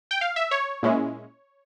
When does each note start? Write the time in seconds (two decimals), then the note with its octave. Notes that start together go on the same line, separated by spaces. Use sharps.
0.11 G5
0.21 F5
0.36 E5
0.51 C#5
0.83 A#2 G#3 C#4 E4